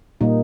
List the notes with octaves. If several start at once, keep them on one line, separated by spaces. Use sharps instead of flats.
A#2 G3 A#3 D#4